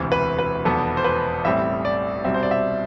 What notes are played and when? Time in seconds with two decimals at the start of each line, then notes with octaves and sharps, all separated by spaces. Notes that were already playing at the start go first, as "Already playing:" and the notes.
Already playing: E1 D2 C3 E3
0.12 B4
0.39 B4
0.65 F1 E2 B2 B3 A4
0.97 C5
1.04 B4
1.45 A1 A2 G3 C4 E5
1.85 D5
2.24 C2 B2 G3 C4 E5
2.34 C5
2.43 D5
2.51 E5